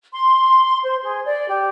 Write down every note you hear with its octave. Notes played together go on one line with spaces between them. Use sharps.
C6
C5
G#4
D5
G4